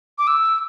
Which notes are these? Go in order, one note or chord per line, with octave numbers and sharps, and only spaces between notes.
D6
E6